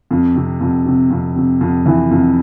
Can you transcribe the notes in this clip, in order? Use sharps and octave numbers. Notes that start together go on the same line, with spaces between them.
F2
C3
F2
C3
F2
C3
F2
E3
F2